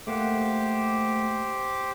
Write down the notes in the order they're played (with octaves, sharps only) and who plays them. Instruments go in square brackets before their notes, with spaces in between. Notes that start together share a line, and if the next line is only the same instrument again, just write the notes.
[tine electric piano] A3 A#3 F#5 [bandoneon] G4 C5 D6